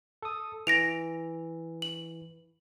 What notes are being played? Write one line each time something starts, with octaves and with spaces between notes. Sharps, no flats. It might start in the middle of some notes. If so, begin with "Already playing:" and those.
A4 D#6
E3 A#6 D7 F7
F#7